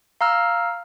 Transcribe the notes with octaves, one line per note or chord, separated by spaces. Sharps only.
F5 A#5 E6 F6